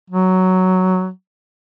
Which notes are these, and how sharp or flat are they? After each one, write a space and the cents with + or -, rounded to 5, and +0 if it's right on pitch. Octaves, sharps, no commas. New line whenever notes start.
F#3 +5